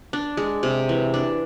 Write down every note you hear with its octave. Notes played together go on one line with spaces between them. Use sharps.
D4
G#3
C3
E3
D4